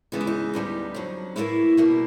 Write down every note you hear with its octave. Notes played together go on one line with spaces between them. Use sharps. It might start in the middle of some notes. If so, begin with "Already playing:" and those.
D2 C#3 E3 G#3 B3 D#4
E4
D#4
D2 D3 G3 B3
F2 D3 F#3
A2 E3 G3 A#3 E4
B2 G3 A#3